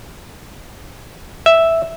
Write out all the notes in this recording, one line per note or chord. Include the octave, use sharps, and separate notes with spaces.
E5